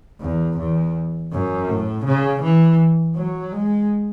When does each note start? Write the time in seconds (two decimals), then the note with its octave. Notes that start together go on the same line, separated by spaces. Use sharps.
0.21 E2
0.58 E2
1.32 F#2
1.69 A2
2.05 C#3
2.43 E3
3.16 F#3
3.52 G#3